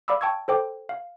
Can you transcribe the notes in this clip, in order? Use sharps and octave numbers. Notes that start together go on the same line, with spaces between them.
D5 F5 B5 D6 E6
G5 A5 C#6 E6 G#6
A4 C5 G5 D6
F5